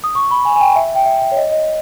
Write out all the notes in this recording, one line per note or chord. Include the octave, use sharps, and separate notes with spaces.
D#6
C#6
B5
G#5
G#5
G5
E5
G5
E5
E5
C#5
D#5
D#5